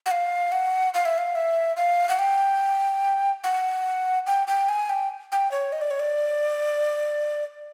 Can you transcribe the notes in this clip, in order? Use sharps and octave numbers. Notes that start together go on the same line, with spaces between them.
F#5
F5
F#5
F5
E5
F5
E5
F5
F#5
G5
F#5
G5
G5
G#5
G5
G5
C#5
D#5
D5
C#5
D5